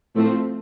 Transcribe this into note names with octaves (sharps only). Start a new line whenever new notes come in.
A2 F3 A3 C4